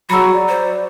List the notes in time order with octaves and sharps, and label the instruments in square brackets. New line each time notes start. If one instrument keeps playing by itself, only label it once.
[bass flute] F#3 [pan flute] F#4 [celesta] G#4 A#5 C#7 [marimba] B5 E6
[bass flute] D5
[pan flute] C5